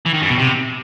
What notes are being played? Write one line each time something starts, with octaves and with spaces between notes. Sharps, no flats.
E3
D#3
F#2
B2
C3